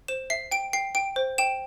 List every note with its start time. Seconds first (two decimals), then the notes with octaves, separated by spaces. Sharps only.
0.08 C5 E7
0.30 E5 C7
0.51 G5 D7
0.73 G5 C7
0.95 G5 D7
1.16 C5
1.38 G5 E7